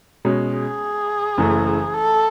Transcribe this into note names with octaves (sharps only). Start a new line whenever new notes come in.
B2 G#3 C#4
G#4
F#1 F#2 E3 A3
A4